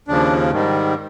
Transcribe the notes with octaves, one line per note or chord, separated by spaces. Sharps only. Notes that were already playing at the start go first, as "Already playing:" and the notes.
D#2 C#3 F3 D4
G#2 D#3 G3